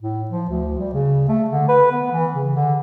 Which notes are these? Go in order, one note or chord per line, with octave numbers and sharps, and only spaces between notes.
A2
F3
D2
G3
C#3
A3
D3
B4
B3
E3
C#3
D3